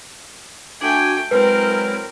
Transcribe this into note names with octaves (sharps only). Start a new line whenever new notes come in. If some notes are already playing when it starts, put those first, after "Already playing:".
A3 D4 F#4 G5 G#5
F#3 G#3 C4 E4 A#4 B4